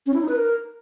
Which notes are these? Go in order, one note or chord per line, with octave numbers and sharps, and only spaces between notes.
C#4
E4
D#4
B4
A#4